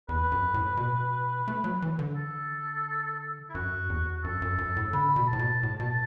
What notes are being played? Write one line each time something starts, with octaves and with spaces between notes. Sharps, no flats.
E2 B4
F#2
A2
B2
A3
F#3
E3
D3
A4
E4
F#2 F#4
E2
F#2 A4
F#2
F#2
A2
D3 B5
B2
A5
A2
B2
A2
B2